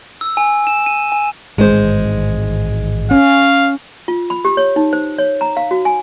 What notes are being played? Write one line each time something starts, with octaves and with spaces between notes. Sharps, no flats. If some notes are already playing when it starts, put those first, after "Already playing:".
E6
G#5
E7
D#7
G#5
A1 G#2 D#3 G#3 C5
C#4 F5
F4
B5
G4
C#5
D#4
C5
C#5
A#5
F5
F#4
G#5